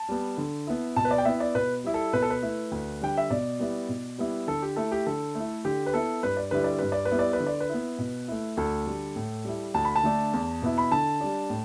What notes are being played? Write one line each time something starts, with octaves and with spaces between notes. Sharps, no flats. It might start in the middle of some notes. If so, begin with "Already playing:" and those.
Already playing: A5
G3 B3
D3
B3 E4
B2 A5
B4
D5
G5
B3 E4 E5
D5
B2 B4
G3 E4
A4
B2 B4
A4
B4
A3 E4
D2
D3 G3 G5
E5
B2 D5
G3 B3 E4
B2
G3 B3 E4
D3 A4
G4
A3 E4 A4
G4
D3 A4
A3 E4
D3 G4
B4
B3 E4 A4
G2 B4
D5
D3 G3 E4 B4
D5
G2 B4
D5
B4
G3 B3 E4
D5
B4
D3
D5
B4
B3 E4
B2
A3 E4
D2 A4
D3 G3
A2
G3 E4
D2 A5
B5
A5
D3 A3 D4
E2
B2 B3 E4
B5
D3 A5
G3 D4
A2